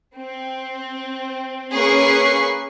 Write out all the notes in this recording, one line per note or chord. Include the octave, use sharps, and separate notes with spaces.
C4
A#3 C#4 G#4 B4 C#6 C7